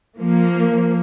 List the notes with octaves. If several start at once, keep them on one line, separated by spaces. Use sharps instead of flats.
F3 A#3